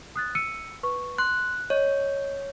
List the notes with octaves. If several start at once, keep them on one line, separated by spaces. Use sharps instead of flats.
D#6 F#6 A6
E6 C#7 D#7
B4 C#6
C6 F#6
C#5 D#5